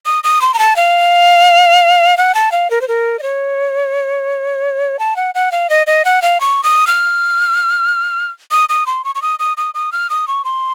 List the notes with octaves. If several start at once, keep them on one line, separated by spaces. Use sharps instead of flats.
D#6
D#6
C6
A#5
A5
F5
F#5
A5
F5
A#4
C5
A#4
D#5
C#5
A5
F#5
F#5
F5
D#5
D#5
F#5
F5
C#6
D#6
F6
D#6
D#6
C6
C#6
C#6
D#6
D#6
D#6
D#6
F6
D#6
C#6
C6